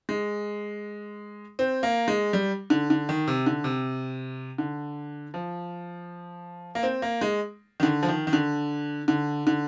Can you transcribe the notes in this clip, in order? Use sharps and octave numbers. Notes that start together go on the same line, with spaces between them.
G#3
C4
A#3
G#3
G3
D3
D3
D#3
C3
D3
C3
D3
F3
A#3
C4
A#3
G#3
D#3
D3
F3
D#3
D#3
D3
D3
D3